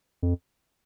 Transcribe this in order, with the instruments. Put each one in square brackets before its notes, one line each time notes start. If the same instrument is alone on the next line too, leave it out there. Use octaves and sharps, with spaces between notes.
[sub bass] F2